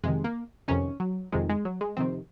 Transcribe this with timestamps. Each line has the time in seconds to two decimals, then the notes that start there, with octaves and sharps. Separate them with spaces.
0.03 F2 C3 D#3 G#3
0.24 A#3
0.68 F2 C3 D#3 C#4
1.00 F#3
1.32 F2 C3 D#3 G#3
1.49 G#3
1.65 F#3
1.81 G#3
1.97 F2 C3 D#3 C4